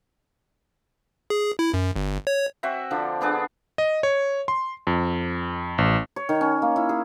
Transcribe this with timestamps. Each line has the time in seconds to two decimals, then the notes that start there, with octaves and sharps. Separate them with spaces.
1.30 G#4
1.59 E4
1.74 F#2
1.96 G1
2.27 C#5
2.63 C4 F#4 E5
2.91 D3 F3 D4
3.21 B3 D4 G#4 A4
3.78 D#5
4.03 C#5
4.48 C6
4.87 F2
5.78 A1
6.16 C#5
6.29 D#3
6.41 C#4
6.62 A#3
6.76 E4
6.89 G#4